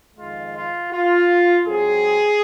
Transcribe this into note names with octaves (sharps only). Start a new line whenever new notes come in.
F2 D#3 G#3 F4
F4
F4
G#2 F#3 C4 G#4